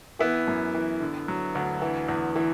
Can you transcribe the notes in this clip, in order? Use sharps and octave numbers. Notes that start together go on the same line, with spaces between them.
E3 B3 E4
F#2
E3
D3
F#3
D2
E3
E2
E3